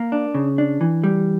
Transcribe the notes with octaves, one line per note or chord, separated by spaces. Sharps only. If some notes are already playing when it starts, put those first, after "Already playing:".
Already playing: A#3
D4
C#3
D4
E3
G3